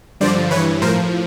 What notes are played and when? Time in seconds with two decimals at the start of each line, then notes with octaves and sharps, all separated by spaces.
0.20 G2 D3 F3 C5 D5
0.51 G2 E3 B4 C#5
0.81 A2 F3 A#4 C5